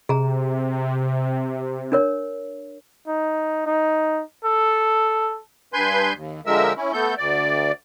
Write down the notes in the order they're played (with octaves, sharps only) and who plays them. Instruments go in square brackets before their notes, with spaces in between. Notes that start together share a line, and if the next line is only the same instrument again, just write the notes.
[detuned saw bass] C3 [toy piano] G#4 A#5
[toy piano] D4 A#4 C#5
[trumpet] D#4
D#4
A4
[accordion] G2 B4 G#5 C6 G6
D#2
D3 F3 G#3 A#4 E5 E6
C#4 E4
A3 B3 A4 G6
D2 D5